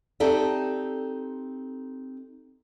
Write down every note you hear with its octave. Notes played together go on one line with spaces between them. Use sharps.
C4 D#4 G4 A4 D5 E5